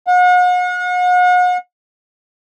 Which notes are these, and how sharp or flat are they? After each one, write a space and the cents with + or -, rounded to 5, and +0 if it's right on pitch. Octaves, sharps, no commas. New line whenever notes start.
F#5 -40